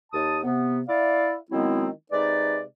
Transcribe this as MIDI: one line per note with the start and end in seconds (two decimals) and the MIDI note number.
0.13 0.39 39
0.13 0.39 81
0.13 0.39 87
0.44 0.81 48
0.44 0.81 59
0.88 1.34 64
0.88 1.34 74
0.88 1.34 77
1.51 1.88 51
1.51 1.88 54
1.51 1.88 56
1.51 1.88 59
1.51 1.88 60
1.51 1.88 64
2.11 2.62 48
2.11 2.62 56
2.11 2.62 63
2.11 2.62 71
2.11 2.62 74